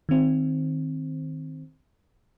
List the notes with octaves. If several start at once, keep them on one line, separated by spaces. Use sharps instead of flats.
D#3 C4